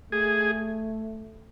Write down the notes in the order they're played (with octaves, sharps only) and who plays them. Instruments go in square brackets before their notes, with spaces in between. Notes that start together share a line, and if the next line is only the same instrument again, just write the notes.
[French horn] A3 [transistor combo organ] G#4